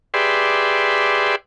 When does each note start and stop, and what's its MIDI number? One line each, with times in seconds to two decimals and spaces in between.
0.14 1.36 67
0.14 1.36 68
0.14 1.36 71
0.14 1.36 74
0.14 1.36 76
0.14 1.36 84